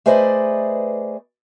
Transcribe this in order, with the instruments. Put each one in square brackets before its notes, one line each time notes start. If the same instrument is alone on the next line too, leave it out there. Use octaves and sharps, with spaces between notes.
[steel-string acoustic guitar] A3 G#4 B4 C5 D5 D#5